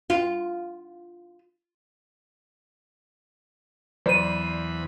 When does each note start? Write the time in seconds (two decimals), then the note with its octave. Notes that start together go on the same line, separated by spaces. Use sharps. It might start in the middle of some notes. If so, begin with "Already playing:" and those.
0.10 F4
4.06 E2 F#3 C5 D5 B5 D#7